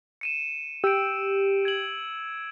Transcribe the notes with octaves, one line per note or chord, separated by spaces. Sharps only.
C#7 D#7 E7
G4 E6 D7
G#6 F#7